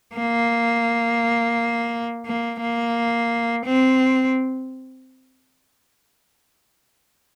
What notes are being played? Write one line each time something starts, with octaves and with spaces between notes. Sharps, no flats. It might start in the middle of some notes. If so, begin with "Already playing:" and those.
A#3
A#3
A#3
C4